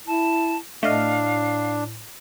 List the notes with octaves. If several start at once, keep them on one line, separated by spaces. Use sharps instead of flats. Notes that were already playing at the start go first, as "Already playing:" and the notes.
E4 A5
A2 A3 D4 D#5 F5 F6